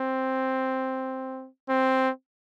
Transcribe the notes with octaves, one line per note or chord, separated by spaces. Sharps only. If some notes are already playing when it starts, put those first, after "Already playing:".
Already playing: C4
C4